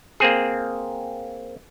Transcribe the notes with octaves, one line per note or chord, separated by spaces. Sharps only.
A#3 C4 G#4